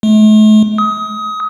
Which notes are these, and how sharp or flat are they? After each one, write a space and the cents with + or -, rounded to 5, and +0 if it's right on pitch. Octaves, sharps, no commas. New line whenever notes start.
A3 -40
D#6 +25